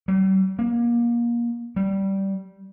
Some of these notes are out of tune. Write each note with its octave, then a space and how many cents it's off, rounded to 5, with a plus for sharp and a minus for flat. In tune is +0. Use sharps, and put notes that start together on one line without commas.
G3 -45
A#3 +25
G3 -15